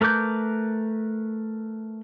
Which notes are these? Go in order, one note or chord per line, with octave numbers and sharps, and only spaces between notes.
A3 A#4 B4 D6 G6